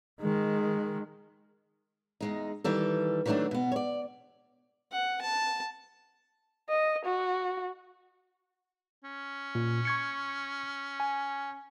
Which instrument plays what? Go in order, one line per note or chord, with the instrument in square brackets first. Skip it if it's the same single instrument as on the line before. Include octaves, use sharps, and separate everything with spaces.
[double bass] D#3 G#3
[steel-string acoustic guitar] E2 G#3 D#4
D#3 E3 G3 A4
D#3 E3 F#3 G3 A3 D4
B2 B3
C#5 D5
[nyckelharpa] F#5
A5
[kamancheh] D#5
F#4
[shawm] C#4
[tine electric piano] A#2
C#6 G#6 C#7
G#5